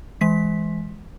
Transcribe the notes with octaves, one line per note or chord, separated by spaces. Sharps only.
E3 G#3 B6